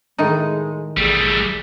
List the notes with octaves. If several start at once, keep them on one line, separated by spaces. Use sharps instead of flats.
A2 D#3 G#3 D#4
A1 G3 A3 G#4